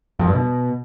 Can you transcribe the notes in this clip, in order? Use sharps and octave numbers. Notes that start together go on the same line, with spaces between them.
F2
G2
B2